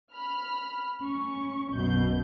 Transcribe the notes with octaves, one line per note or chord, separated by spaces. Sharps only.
B5 F6
C#4 C#6
B1 F#2 B2 G6